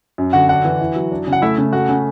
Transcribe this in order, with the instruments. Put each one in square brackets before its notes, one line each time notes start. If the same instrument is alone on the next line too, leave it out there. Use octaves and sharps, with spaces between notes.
[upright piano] F#2
[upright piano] D3 [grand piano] F#4 F#5
[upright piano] D4 [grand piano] F#4 F#5
[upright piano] E3
E4
F#3
D4
C#3
[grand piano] F#5
[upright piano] A3 [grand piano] E4 E5
[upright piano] C#3
[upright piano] A3 [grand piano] F#4 F#5
[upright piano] C#3